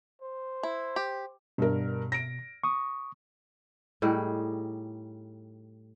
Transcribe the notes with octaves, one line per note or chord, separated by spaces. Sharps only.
C5
E4
G4
G2 B2 A#4
A#6 D7
C#6 D#6
A2 G3 D#4 G#4